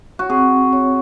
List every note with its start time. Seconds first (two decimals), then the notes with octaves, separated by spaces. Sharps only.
0.19 F#4
0.30 C4 G#4
0.73 C#5